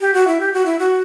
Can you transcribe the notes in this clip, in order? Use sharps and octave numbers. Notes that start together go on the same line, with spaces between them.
G4
F#4
E4
G4
F#4
E4
F#4